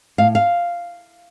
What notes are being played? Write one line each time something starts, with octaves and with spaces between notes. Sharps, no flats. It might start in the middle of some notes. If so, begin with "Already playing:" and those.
A2 F5
F5